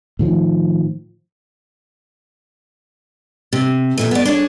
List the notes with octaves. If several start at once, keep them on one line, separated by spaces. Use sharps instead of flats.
A2 D#3 F3
C3
E2 A#2 A3
B3 D5
D4 G#4 C#5